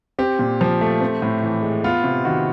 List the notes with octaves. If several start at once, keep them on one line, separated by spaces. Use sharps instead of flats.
C4 G4
A#2
F3
A3
C4
A2
E3
G#3
B3 F4
C3
D#3 F#4